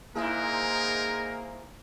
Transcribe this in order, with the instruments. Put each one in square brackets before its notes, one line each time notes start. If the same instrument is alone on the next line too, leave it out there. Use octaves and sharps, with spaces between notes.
[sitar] G#2 E4 G#4 [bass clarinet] A#3 [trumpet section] D#4 C5 G#5 [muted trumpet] A#4